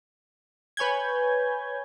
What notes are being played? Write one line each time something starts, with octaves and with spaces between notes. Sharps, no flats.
B4 C#5 G#5 G6 G#6